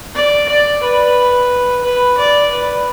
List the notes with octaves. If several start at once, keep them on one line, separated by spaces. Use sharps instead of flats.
D5
D5
B4
B4
D5
B4